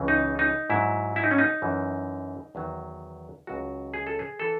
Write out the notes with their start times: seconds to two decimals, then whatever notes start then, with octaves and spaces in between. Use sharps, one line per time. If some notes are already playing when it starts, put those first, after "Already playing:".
Already playing: C#2 C#3 E3
0.08 D#4
0.39 D#4
0.70 G#2 F#3 E4
1.16 E4
1.24 D#4
1.31 C#4
1.38 D#4
1.62 F#2 E3
2.55 E2 D#3 F#3
3.47 C#2 C#3 F#3 F#4
3.94 G#4
4.07 A4
4.19 G#4
4.39 E3 A4